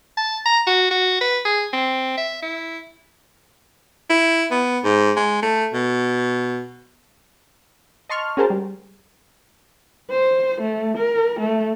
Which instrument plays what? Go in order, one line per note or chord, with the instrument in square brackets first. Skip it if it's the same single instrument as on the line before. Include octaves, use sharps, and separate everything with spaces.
[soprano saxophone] A5
A#5
F#4
F#4
B4
G#4
C4
E5
E4
[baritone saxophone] E4
B3
G#2
G#3
A3
B2
[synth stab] D#5 A5 C6 C#6 F6
C#4 F#4 G#4 A#4 C5 A5
G3
[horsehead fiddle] C5
A3
A#4
A3